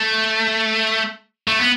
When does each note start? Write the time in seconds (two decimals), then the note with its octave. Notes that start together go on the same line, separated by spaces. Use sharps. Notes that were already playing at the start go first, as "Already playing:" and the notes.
Already playing: A3
1.47 A3
1.59 B3